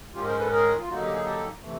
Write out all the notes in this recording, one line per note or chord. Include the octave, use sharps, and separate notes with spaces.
G#2 D#3 G#3 C#4 F4 G4
A#4 C5
A4 B4
G#4 A#4
F4
D3 F#3 A#3 D#4 F#4
G4
G#4
G4 A4
C3 E3 A3